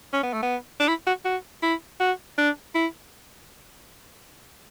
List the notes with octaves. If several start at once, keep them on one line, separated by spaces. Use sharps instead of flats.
C#4
B3
A3
B3
D4
E4
F#4
F#4
E4
F#4
D4
E4